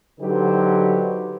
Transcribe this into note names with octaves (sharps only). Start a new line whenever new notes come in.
D3 F#3 D#4 G4 B4 C5